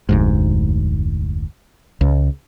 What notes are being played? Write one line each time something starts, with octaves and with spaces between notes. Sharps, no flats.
F1 D2 G#2
C#2